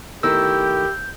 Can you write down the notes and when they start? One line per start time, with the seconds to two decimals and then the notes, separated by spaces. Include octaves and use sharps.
0.23 D#3 A3 E4 G4 E6 G6